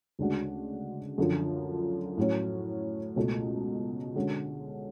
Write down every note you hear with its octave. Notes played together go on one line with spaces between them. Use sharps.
D2 C#3 G#3 D4 F#4
F#2 D3 F3
A2 F#3 C#4
C#2 B2 A3
D3 G#3 C#4 F#4